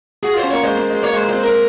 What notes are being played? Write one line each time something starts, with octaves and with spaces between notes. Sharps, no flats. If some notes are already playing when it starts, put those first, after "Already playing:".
F#4 G#4
F4 C5
C#4
A#3 C#5
G#3 C5
A#3
G#3
A#3 C#5
G#3 C5
A#3
C4 C5
C4 A#4